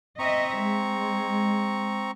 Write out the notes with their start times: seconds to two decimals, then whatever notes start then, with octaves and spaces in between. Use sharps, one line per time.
0.19 C4 D#5 E5 A#5 C#6
0.60 G#3